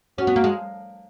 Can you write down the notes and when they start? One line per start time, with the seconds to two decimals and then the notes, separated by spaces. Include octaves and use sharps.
0.18 C#4 F#4
0.27 B3
0.36 A#3
0.44 G#3